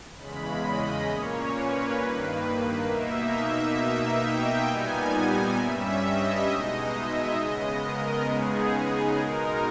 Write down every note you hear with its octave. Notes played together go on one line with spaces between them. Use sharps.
E2 C#3 G#3 B5
D#5
A#2 A#3 C#4 C#5
B4
G2 D#3 A#3
B2 A#3 D#4 E5
E5
B2 A#3 D#4 E5
G5
A#2 G3 B3 D#4 G#5
G#5
G2 G3 C#4 E5
D#5
B2 G#3 D#4
E5
C#3 G#3 B3 D#5
A#4
C#3 G#3 B3 D#4 G#4
B2 G#3 D#4 A#4